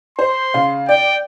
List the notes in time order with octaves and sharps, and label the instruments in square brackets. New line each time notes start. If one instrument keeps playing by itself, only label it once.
[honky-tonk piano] C5 [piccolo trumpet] C6
[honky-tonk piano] C#3 F5
[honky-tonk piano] D5 [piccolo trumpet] G5